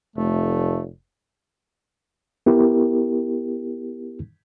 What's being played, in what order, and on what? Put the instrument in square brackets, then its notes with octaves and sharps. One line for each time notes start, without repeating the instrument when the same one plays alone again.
[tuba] F1 [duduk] A3
[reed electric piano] B3 E4 G4 A#4